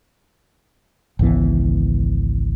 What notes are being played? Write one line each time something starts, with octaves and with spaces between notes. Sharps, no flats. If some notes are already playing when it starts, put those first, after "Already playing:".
G#1 C#2 E3 B3